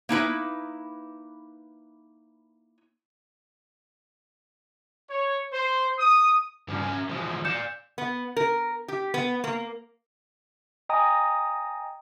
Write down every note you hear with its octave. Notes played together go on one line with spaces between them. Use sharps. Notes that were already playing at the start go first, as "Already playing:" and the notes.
A#3 D#4 E4 B4
C#5
C5
D#6
G2 C#3 F3
C#4 A#4 G#5
E3 F3 G#3
D5 F5 G6 C#7 E7
B3
A#4
G4
B3
A#3
D#5 G5 G#5 A#5 D#6